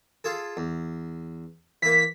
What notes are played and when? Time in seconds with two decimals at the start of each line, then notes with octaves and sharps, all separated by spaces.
0.24 F4 G#4 A4
0.57 E2
1.82 E3 A#3 B6